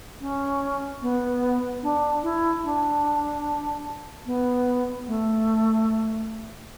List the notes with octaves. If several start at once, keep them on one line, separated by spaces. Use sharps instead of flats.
C#4
B3
D4
E4
D4
B3
A3